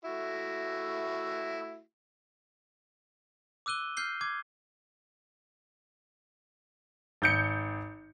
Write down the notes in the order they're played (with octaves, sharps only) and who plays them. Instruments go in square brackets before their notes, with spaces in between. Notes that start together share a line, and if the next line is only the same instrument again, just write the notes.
[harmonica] A3 E4 F#4
[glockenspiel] D6 E6 F#6 D#7 G7
F6 G6 C7 G7
D6 G#6
[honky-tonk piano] G#1 G6 C#7